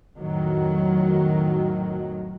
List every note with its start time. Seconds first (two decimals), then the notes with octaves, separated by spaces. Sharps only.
0.16 F2 A2 D#3 F#3